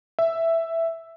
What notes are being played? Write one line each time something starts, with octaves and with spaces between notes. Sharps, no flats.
E5